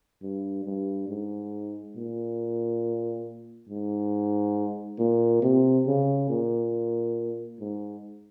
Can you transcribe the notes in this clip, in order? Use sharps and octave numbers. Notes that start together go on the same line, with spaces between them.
G2
G2
G#2
A#2
G#2
A#2
C3
C#3
A#2
G#2